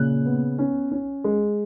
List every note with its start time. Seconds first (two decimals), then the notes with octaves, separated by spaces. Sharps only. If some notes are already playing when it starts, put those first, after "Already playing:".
Already playing: A#2 C#3 F#6
0.26 B3
0.59 C#4
0.92 C#4
1.24 G#3